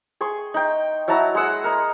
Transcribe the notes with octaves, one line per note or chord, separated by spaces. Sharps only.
G#4 C6 C#6
D#4 G5
F#3 E4 A5 A#5
G#3 G#4 F#5 E6
A#4 D#5